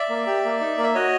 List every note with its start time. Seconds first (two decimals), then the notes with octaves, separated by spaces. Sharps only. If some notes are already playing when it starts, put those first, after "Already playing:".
Already playing: D5 E5
0.09 A#3
0.26 G4
0.44 A#3
0.61 D#4
0.78 A#3
0.83 E5
0.94 F#4 C#5 D#5